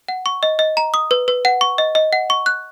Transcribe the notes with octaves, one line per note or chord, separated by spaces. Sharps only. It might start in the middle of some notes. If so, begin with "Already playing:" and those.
F#5
C#6
D#5
D#5
A#5
D#6
B4
B4
F#5
C#6
D#5
D#5
F#5
C#6
F#6